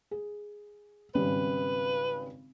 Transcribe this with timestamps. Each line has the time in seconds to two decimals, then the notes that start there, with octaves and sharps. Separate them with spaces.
0.11 G#4
1.15 G#1 C#3 G3 B4